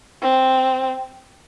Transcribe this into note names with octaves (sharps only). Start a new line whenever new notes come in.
C4